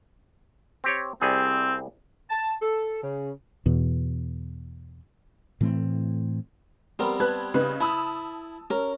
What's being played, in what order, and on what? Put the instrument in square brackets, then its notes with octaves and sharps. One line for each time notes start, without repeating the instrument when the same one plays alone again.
[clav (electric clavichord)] C4 G4 C#5
[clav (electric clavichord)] C2 G3 G#4 [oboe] C4
[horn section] A5
A4
C#3
[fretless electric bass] E2 B2
A2 E3 A3 C4
[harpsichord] G3 B3 C4 [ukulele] A#4
[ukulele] B4 [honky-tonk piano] A5 F#6 G#6
[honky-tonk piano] C#3 D#4 [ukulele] B4
[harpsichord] E4 B5 [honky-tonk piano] A5 D#6 E6
[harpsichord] C#4 [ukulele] A#4